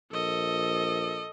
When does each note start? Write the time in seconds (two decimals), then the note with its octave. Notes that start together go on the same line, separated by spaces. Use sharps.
0.12 A#1 A4 D#5